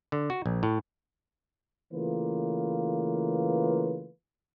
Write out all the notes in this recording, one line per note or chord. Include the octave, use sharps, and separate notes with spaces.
D3
F#4
A#1
A2
C#3 E3 A3 A#3 F4 B4